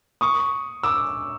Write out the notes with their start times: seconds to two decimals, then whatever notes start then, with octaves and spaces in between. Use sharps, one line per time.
0.21 C#6 D#6
0.83 D6 E6